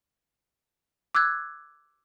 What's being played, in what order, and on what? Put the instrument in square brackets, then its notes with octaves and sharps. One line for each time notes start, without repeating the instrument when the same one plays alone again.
[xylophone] D6 E6 F#6 G#6